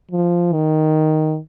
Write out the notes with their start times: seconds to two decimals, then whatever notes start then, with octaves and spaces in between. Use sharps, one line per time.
0.11 F3
0.53 D#3